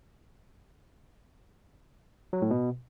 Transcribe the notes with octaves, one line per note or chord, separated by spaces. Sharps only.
F#3
A2
B2